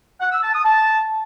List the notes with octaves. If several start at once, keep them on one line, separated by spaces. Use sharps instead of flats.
F#5
E6
A5
D#6
A5